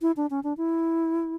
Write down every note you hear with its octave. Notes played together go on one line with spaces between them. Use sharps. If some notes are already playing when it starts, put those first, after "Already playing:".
E4
D4
C#4
D4
E4